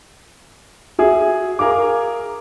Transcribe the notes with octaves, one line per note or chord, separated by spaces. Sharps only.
F#4 G#4 E5
G#4 A#4 F5 D6